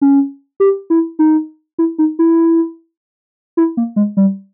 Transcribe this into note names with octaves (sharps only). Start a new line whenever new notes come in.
C#4
G4
E4
D#4
E4
D#4
E4
E4
A#3
G#3
G3